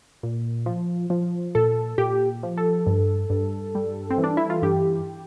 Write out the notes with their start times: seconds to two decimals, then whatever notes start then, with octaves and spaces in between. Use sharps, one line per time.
0.23 A#2
0.66 F3
1.10 F3
1.55 A#2 A4
1.98 A#2 G4
2.43 F3
2.57 A4
2.87 G2
3.30 G2
3.75 G3
4.10 C4
4.18 E3
4.24 D4
4.37 E4
4.50 F4
4.62 G2 G4